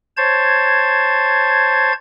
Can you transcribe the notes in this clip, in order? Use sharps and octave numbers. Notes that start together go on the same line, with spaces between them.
C5 C#5 A5 G#6